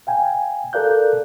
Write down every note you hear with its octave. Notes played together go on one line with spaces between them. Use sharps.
F5 G5 G#5
A4 A#4 D5 F5 F#6 G6